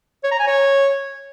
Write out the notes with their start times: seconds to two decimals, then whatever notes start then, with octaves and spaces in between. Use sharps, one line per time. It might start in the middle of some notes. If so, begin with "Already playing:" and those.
0.23 C#5
0.31 A#5
0.39 G#5
0.47 C#5